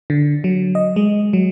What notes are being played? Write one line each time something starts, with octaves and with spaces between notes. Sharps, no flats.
D3
F#3
D#5
G#3
F#3